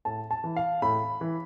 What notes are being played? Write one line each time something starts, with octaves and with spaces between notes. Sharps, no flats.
A2 A5
A5
E3
F5
A2 B5
E3